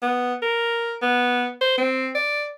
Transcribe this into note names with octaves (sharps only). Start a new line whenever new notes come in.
B3
A#4
B3
C5
C4
D5